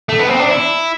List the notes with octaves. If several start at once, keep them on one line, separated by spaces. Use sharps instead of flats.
A3
B3
C4
D4
E4